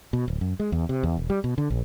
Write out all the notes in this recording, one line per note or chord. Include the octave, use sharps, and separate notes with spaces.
B2
D1
F#2
G#3
E2
C3
E2
E1
G3
B2
D3
A#1